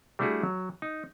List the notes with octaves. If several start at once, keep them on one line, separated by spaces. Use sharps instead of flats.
G3 A3 D4 E4 F#4 G#4
F#3
D#4